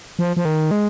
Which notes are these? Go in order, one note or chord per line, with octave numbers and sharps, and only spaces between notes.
F3
F3
D#3
G#3